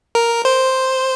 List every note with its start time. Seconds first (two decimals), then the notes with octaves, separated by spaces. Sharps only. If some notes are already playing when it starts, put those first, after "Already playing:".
0.15 A#4
0.45 C5